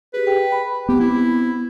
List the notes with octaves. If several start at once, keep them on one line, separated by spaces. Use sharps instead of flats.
G4 G#4 B4
G5
B5
B3 C4 G4
E4